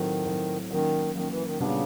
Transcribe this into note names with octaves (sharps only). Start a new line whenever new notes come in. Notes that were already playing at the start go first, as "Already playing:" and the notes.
Already playing: A2 D#3 F#3 A3 C4
A2 F#3 A3 C4
D#3 F#3 A#3 C#4
D#3 F#3 A#3 C#4
E3
D#3
A#2 C#3 G3 B3 D4 F#4